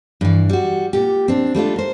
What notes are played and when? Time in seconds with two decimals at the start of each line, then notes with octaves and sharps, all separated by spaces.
0.21 G2 E3
0.49 G3 F#4
0.93 A#2 G4
1.28 C4 D4
1.55 G3 A3 D4 F4
1.76 A#4 C5